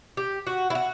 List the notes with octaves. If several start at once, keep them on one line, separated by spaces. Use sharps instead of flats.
G4
F#4
E4
F#4